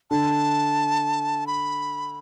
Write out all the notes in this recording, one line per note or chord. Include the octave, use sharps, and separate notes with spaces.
D3 A5
B5